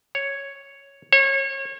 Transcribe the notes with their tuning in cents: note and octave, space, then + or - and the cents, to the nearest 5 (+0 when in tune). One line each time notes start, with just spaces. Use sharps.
C#5 +0
C#5 -30